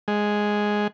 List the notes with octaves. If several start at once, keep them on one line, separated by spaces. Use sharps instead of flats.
G#3